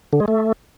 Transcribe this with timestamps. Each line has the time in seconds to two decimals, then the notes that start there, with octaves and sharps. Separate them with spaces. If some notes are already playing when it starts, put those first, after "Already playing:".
0.13 D3
0.20 G#3
0.28 A3